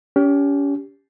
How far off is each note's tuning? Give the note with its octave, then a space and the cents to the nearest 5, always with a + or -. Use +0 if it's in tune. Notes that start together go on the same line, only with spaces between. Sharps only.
C#4 +30 G4 +0